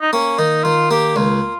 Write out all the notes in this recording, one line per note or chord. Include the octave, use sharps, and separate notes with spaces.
D#4
A#3 C#4
D#3 D#4
D#3 F4
A#3 G4
C#2 F4